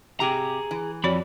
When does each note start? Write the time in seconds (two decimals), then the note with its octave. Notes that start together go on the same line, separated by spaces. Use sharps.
0.20 C3 G4 G#4 A#5
0.71 E3
1.04 F2 F#4 C#5 D5 B5